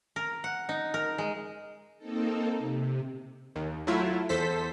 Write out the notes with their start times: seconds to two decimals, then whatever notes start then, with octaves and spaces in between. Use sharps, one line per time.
0.16 A#4
0.44 F#5
0.69 D#4
0.94 A#4
1.18 G#3
1.98 A#3 C4 D#4 A4
2.59 C3
3.56 D#2
3.87 F#3 A3 E4 F4
4.29 E2 A4 C5 B6